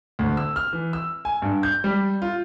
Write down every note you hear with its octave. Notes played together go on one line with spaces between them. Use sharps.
D2
E6
F6
E3
E6
G#5
G2
G6
G3
F4